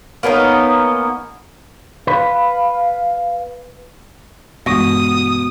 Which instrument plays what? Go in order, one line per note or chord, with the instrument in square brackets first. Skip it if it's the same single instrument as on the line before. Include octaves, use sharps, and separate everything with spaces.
[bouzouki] A#3 B3 C#4 D#4
[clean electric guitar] B4 [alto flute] F5
[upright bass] G2 E3 [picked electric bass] B2 [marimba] G#3 C#6 A#6 [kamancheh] D#6